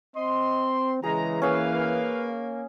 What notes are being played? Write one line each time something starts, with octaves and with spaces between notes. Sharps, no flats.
C4 D#5 C6
C#3 E3 G#3 G#4 A#5
A#3 C#4 G#4 B4 F5 E6